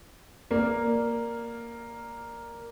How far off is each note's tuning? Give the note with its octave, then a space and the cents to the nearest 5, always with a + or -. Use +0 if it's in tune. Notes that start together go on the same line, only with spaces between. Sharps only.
A#3 +0 D5 +0